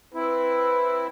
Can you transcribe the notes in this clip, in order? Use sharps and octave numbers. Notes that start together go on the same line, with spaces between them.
C4 E4 B4